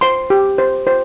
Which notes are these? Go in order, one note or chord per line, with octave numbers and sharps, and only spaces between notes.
C5 C6
G4
C5
C5